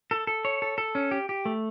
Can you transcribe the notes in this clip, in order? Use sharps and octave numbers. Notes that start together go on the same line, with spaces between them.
A4
A4
C#5
A4
A4
C#4
G4
G4
A3